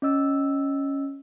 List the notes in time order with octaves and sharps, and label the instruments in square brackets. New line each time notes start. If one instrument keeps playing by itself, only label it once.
[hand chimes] C#4 D#5 E6